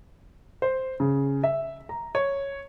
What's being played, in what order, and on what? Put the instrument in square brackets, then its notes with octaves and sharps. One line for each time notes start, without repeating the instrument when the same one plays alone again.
[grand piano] C5
C#3
E5
A#5
C#5